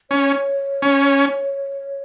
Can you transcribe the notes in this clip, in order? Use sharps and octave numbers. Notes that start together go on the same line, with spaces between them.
C#4 C#5
C#4